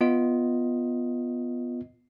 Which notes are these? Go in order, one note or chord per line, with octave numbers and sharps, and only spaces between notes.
B3 F4 D#5